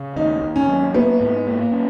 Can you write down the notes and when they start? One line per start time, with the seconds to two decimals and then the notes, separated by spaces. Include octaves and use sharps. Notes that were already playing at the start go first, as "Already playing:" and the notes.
Already playing: C#3
0.16 D#2 D#4
0.42 D#2
0.56 C#4
0.68 F#3
0.94 A#3 B3
1.20 G#2
1.47 A#3
1.72 C#4